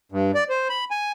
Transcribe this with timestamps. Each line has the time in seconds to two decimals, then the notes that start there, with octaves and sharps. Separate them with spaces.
0.12 G2
0.35 D5
0.49 C5
0.69 B5
0.91 G#5